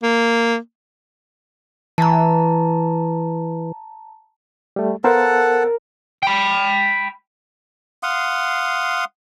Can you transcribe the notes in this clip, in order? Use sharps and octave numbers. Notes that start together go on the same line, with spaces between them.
A#3
E3 A5 A#5
G3 A3
B3 A4 A#4 C5 F5 F#5 A5
G5 B5
F5 F#5 C6 D#6